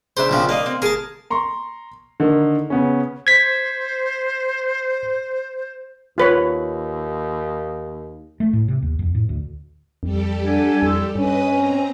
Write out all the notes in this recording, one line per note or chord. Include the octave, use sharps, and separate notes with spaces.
C#3 D4 C5 E5
A#1 C3 F3
A#3 D5 D#5 F5
C4
G#4 A#4 A5
A#5 C6 C#6
D3 D#3 A#3 D#4
C#3 B3 C#4
C5 G#6 B6
D#2 F4 B4 C#5
A3
A2
C3
D#2
F2
A2
D2
F2 G3 G4 A4
D4 F#5 G#5 G#6
F2 E4 C6 E6
G2 C#4 B4 D#5 G#5 D#6
C4 A#5